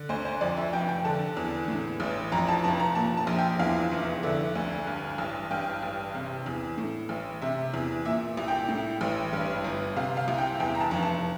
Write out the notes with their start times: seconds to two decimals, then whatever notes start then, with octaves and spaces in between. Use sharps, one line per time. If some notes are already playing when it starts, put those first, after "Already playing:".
Already playing: D3
0.09 D2 C5
0.25 C5
0.41 F2 D5
0.57 E5
0.73 F1 G5
0.89 G5
1.05 D3 A5
1.37 E2
1.68 A2
2.00 A1
2.32 F2 A#5
2.48 A5
2.64 F1 A5
2.79 A#5
2.95 A#2 A5
3.17 A5
3.27 A#1
3.39 G5
3.59 E2 F5
3.92 F1
4.23 D3 E5
4.55 D2
4.87 G2
5.18 A1
5.51 G2 G5
5.82 A1
6.15 C3
6.46 E2
6.78 A2
7.09 A1
7.42 C3 E5
7.74 E2
8.05 A#2 E5
8.37 C2
8.48 G5
8.68 A2
9.01 A1
9.33 G2
9.64 G1
9.96 C3 F5
10.17 F5
10.28 C2
10.38 G5
10.60 E2 G5
10.75 A#5
10.81 A5
10.91 F1
11.03 A5